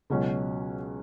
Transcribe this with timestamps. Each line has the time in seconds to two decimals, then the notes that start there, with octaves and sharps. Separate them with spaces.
0.10 C#2 B2 F#3 C#4